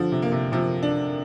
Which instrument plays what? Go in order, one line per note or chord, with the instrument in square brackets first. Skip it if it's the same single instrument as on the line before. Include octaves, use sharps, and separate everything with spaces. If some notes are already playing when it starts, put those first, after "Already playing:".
Already playing: [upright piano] D3 [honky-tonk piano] F3
[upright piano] C3
[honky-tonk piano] A#3
[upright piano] C3
[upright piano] C3 [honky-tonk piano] F3
[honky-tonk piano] D4